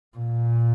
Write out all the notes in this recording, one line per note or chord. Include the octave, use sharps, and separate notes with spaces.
A#2